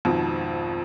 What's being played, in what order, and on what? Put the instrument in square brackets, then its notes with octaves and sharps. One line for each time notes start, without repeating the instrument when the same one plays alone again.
[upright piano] G#1 F2 G#2 B2